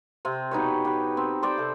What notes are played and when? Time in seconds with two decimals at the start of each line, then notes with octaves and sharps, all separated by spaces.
0.25 C3 C4
0.51 B2 D#4 B4 C#5
0.85 G4 B4
1.17 C4
1.43 C5 D5 G5
1.57 C3 A4